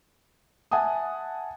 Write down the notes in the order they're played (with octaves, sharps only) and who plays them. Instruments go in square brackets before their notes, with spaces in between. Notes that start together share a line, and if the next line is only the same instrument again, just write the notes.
[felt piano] E5 F#5 G#5 A5 D#6